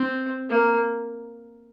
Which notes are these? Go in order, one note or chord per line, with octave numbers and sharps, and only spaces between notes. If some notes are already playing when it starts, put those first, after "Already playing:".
Already playing: C4
A#3